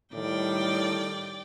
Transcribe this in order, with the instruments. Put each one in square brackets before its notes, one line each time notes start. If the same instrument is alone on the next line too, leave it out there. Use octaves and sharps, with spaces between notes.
[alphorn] A2 [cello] D#3 G3 [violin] D5 G5